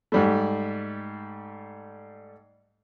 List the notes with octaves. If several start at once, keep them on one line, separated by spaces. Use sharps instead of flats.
G#2 G3 A3